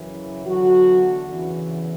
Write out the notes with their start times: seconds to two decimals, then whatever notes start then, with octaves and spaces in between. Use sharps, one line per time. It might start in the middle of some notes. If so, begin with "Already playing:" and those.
Already playing: F#2 C#3 E3
0.45 E2 D3 F#3 F#4
1.28 E2 C#3 E3